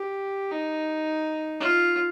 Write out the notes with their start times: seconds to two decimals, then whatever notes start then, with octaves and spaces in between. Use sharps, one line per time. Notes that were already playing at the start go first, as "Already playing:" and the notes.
Already playing: G4
0.52 D#4
1.60 F4